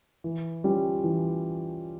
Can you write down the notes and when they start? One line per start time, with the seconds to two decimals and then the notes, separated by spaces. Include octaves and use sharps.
0.24 E3
0.64 G3 C#4 F4
1.04 E3